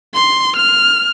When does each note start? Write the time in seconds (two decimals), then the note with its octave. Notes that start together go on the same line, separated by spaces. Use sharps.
0.14 C6
0.56 F6